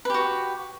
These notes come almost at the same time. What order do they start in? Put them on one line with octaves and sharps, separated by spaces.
B4 G4 F#4